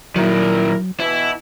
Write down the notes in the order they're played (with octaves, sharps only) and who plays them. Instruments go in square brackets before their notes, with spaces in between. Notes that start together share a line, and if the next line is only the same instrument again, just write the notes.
[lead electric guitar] A#2 D#3 [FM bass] F#3 [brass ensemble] E4 A#4
[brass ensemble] B2 E3 [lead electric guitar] E4